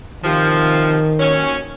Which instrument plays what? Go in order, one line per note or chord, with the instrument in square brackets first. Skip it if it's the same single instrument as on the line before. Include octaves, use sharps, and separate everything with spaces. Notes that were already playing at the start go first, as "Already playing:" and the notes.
[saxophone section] C3 F3 [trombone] D#3
[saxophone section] D#2 F#3 C#4